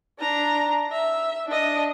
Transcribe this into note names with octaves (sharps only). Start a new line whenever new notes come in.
D4 A#5
E5
D4 D#5